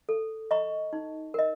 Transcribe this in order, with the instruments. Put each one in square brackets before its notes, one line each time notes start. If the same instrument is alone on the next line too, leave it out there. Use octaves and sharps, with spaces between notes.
[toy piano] A4
D#5 A#5 C#6
D#4
A#4 D#5